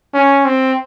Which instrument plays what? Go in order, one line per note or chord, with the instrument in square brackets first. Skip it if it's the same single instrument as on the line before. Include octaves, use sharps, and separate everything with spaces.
[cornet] C#4
C4